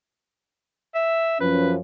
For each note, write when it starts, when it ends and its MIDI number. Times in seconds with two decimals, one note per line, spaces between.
0.95 1.38 76
1.40 1.77 42
1.40 1.77 53
1.40 1.77 61
1.40 1.71 71